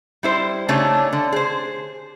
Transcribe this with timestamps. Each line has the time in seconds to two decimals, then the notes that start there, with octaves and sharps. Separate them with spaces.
0.23 G3 E4 C5
0.69 C#3 A3 D4 D#4 G4 C#5
1.13 D3
1.32 G#4 C5